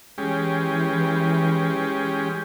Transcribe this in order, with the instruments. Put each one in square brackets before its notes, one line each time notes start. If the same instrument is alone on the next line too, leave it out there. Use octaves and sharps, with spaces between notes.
[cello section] E3 [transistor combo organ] G#3 C#4 G4